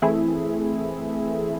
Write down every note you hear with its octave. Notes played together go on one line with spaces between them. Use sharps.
E3 A3 C4 E4 G#4